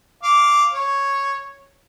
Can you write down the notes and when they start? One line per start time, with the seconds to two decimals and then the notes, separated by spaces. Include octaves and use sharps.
0.24 F5 D6
0.73 C#5